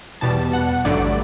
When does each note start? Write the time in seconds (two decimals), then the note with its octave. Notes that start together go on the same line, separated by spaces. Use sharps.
0.21 E2 B2 G3 A5
0.53 F#5
0.85 A1 G2 D3 F#3 A3 D5